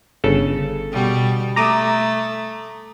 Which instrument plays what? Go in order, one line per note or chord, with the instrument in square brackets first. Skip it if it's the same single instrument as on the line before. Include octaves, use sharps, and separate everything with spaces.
[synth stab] G1 C#3 A4
[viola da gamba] B2 G3
[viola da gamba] A3 [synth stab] A#5 D6 D#6